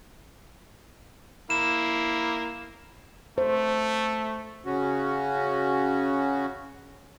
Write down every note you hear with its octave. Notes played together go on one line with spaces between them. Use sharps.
A#3 E4 E7
A3 C5
C#3 C#4 F#4